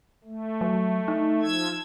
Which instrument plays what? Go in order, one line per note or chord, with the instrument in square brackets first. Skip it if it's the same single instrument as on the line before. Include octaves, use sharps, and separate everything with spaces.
[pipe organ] A3
[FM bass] F#3
D#4
[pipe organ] F3 E6 G#6